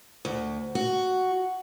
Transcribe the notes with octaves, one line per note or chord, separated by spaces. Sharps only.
D2
F#4